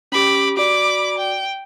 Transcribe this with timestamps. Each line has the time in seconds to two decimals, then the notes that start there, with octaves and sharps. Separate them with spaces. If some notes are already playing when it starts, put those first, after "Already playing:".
0.12 C#4 G4 B5 D6
0.57 F#4 D5 B5 D6
1.18 G5